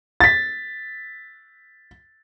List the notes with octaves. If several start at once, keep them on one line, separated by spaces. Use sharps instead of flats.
A6 B6